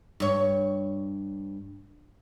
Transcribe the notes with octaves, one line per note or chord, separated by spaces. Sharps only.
G2 C#5